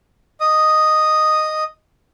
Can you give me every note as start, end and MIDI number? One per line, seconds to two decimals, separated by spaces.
0.41 1.64 75
0.41 1.64 87